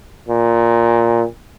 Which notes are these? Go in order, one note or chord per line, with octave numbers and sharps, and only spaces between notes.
A#2